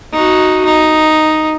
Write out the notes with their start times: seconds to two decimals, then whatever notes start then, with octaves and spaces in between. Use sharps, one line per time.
0.13 D#4 F#4
0.65 D#4